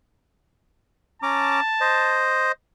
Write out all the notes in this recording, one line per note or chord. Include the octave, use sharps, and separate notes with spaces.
C#4 A5 A#5 D6
C5 D#5